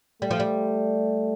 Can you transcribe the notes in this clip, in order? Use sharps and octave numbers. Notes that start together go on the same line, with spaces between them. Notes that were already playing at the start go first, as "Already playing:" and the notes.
G3 A3
F3
G3